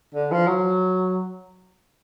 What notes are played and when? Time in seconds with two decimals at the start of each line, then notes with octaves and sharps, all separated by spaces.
0.15 D3
0.31 F3
0.47 F#3